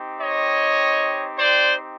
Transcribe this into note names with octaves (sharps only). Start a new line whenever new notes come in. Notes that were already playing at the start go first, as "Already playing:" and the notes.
Already playing: C4 D#4 G4
C#5 D#5
C5 D5